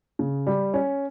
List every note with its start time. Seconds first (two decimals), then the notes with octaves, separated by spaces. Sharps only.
0.19 C#3
0.47 G3
0.74 C#4